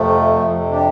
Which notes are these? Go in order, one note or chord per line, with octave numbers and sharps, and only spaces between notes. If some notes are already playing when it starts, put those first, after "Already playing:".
Already playing: F2 C3 F3 A3
F2 C3
D4 G4